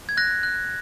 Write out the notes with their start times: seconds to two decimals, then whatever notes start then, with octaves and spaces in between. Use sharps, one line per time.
0.09 G#6
0.17 F#6 A#6
0.43 F#6